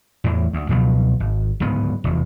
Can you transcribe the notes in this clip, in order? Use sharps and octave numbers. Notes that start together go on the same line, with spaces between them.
E2 A2 E3
D2
C#2 B2 F3 F#3
G#1
D1 G#2 C#3 B3
F1 E2